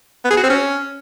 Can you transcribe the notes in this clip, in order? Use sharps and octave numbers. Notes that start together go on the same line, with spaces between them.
B3
G#4
F#4
C4
C#4